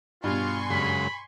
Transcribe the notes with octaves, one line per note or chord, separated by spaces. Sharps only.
G2 B2 F4 G#5 C6 C#6
F#2 C#3 G#3 B5